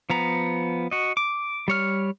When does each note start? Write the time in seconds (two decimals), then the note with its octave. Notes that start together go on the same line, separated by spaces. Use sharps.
0.10 F3 B3 A#5
0.91 F#4 D#5
1.17 D6
1.68 G3 C#5 F6